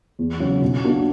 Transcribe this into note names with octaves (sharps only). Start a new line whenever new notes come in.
E2
C#3 F#3 C#4 F#4
B1
B2 A#3 D4 F#4